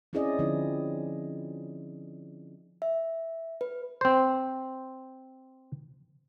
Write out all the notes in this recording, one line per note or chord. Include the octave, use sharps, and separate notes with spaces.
C4 C#4 E4 G#4 D5 D#5
D3 F3 C4 D#4 E4
E5
B4
C4 C5